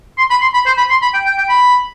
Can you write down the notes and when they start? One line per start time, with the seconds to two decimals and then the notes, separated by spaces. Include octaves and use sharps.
0.18 C6
0.30 B5
0.41 C6
0.54 B5
0.66 C5
0.78 B5
0.90 C6
1.02 B5
1.14 G5
1.26 G5
1.38 G5
1.49 B5